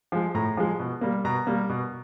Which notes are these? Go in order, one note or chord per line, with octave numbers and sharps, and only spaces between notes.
F3 G#3
A2 A#5
F3 G#3
B2
G3 A#3
B2 A#5
G3 A#3
B2